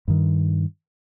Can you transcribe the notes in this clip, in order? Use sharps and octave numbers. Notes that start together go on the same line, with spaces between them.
G2 D#3